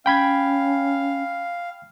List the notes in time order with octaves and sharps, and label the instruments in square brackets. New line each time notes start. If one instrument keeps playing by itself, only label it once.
[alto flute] C#4 [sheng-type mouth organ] F5 [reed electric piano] G5 B5 G#6